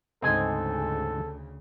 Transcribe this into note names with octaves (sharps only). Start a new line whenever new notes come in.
D2 G#2 C#3 G#3 C4 A4 D#5 G#5